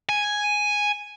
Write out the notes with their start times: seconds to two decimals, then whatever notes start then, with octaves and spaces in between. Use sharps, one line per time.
0.09 G#5